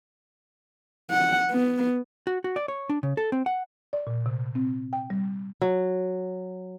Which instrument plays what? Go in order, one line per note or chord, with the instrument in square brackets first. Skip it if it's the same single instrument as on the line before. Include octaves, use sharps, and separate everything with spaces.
[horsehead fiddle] F#5
B3
[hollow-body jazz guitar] F#4
F#4
D5
C#5
D4
C#3
A4
C4
F#5
[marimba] D5
A#2
C3
C4
G5
G3
[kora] F#3